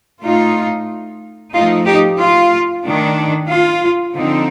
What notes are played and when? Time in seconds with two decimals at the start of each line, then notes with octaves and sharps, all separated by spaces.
0.22 A2 A3 D#4 F4
1.53 F3 A3 D#4 F4
1.86 D#4 G4
2.19 F4
2.84 D#3 A3 D4
3.49 F4
4.15 D3 F3 C4 D#4